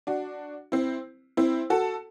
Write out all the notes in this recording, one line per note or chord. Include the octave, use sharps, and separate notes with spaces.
D4 F#4
C4 E4
C4 E4
F#4 A4